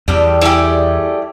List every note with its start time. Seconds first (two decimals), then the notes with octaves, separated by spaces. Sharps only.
0.08 E2 G3 G4 A4
0.41 G3 A3 E4 G4 G#4